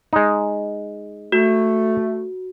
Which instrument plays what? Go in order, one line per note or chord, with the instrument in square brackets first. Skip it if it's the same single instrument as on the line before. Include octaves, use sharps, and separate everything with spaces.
[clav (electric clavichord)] G#3 D#4
[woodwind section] A3 [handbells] F#4